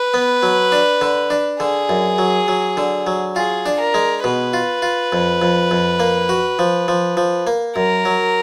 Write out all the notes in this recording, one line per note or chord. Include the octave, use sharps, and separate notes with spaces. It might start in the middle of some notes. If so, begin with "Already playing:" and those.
Already playing: B4
B3
F#3
D4
D3
D4
D3 G#4
F#2
F#3
F#3
D3
F#3
F4 G#4
D4
A#4
G#3
B2 B4
F4
F4
F2
F2
F2
A#3
F#4
F3
F3
F3
A#3
F#2 A#4
F#3